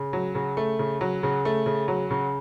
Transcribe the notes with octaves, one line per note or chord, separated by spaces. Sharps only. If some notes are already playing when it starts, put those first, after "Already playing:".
Already playing: C#3
F#3
C#3
A3
C#3
F#3
C#3
A3
C#3
F#3
C#3